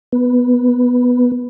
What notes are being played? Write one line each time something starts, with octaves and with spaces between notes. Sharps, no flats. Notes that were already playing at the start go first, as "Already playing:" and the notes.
B3